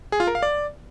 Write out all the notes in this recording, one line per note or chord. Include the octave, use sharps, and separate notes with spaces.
G#4
F4
A#4
F5
D5